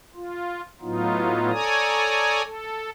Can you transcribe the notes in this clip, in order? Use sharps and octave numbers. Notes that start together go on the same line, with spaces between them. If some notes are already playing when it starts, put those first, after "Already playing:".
F4
A2 F#3 B3 D#4 F4
A4 C#5 D5 G#5 A#5 D#6
A4